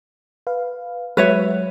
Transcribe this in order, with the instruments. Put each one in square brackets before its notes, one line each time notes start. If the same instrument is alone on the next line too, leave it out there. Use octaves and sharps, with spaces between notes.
[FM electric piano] B4 F5
[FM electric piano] F#3 G#3 F#4 [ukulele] B4 C#5 E5